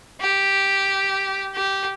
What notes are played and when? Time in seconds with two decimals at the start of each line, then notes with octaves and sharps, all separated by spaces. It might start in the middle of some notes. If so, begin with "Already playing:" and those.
0.21 G4
1.54 G4